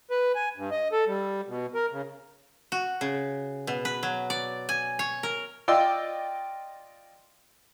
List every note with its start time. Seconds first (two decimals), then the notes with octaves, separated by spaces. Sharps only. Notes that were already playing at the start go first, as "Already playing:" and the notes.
0.11 B4
0.35 G#5
0.57 G2
0.71 D#5
0.92 A4
1.07 G3
1.47 B2
1.75 A#4
1.92 C#3
2.72 F#4
3.01 C#3
3.67 B2
3.85 B4
4.03 F#3
4.30 D5
4.69 G#5
4.99 C#5
5.23 A#4
5.68 F4 D5 D#5 G5 E6